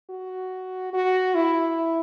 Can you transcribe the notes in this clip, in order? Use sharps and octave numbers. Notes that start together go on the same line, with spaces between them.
F#4
F#4
E4